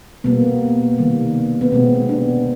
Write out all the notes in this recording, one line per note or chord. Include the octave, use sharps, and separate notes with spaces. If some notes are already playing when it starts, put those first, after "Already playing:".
B2 G3 A#3 B3
C3 D#3 G3 A#3
B3
B2 G#3 C4
D4